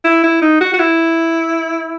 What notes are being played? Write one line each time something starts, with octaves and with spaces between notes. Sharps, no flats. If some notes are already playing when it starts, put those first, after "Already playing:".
E4
E4
D#4
F#4
F#4
E4